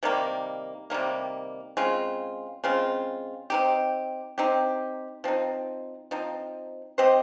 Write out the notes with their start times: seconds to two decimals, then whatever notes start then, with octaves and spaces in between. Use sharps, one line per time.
0.03 C3 D#3 G3 A#3
0.90 C3 D#3 G3 A#3
1.77 C#3 G#3 C4 F4
2.64 C#3 G#3 C4 F4
3.50 C4 D#4 G4
4.38 C4 D#4 G4
5.24 F3 C4 D#4
6.11 F3 C4 D#4
6.98 C4 G4 C5 D#5